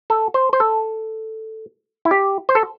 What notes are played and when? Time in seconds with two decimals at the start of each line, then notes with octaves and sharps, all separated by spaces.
0.10 A4
0.34 C5
0.53 C5
0.60 A4
2.05 E4
2.11 G4
2.49 C5
2.55 A4